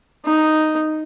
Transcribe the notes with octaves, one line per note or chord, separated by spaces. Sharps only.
D#4